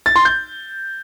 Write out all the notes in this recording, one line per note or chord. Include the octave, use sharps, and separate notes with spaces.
A6
C6
G6